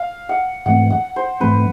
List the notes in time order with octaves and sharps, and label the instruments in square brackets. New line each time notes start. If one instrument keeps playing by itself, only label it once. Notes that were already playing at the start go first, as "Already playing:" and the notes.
Already playing: [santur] F5
F#5
[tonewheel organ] G#2 E3 A3 C4 [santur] F#5
[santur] F#5
C5
[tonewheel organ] G#2 E3 A3 C4 [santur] B4